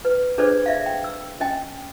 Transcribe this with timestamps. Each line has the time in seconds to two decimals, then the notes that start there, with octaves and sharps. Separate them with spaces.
0.05 B4
0.38 D4 G#4 A4 B4 C5 D5
0.66 D5 E5 F5
0.86 G5
1.04 E6
1.40 C#4 D#5 G5 G#5